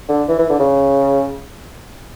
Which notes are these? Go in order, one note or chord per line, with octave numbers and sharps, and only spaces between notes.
D3
E3
E3
D3
C#3